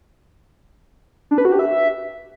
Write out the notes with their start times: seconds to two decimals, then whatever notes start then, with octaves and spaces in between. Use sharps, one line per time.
1.31 D4
1.38 B4
1.45 F#4
1.52 G4
1.59 E5